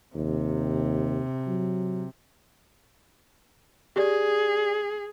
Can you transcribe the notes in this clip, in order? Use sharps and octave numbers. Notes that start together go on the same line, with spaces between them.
D#2 C3
F#3
G4 G#4 D5